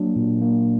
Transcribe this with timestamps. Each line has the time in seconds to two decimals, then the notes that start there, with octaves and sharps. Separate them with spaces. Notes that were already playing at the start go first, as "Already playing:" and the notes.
Already playing: F#3 A#3 D4
0.16 A#2
0.42 A#3